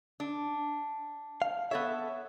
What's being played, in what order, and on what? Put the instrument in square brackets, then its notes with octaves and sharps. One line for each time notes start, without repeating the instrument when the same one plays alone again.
[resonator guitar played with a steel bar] D4
[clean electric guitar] F5
[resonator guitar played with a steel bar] B3 A4 C#5 [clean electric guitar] E5